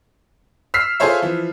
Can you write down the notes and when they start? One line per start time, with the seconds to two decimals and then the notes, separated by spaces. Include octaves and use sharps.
0.74 E6 F6 B6 C7
1.00 F4 G#4 A4 C5 C#5 E5
1.22 E3 F3